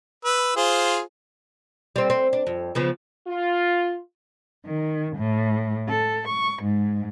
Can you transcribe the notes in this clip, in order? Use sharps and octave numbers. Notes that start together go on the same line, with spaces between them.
B4 E6
F4 G#4 C5
G3 C4
C4
D4
F2
C#3 F3 B3
F4
D#3
A2
A4
C#6
G#2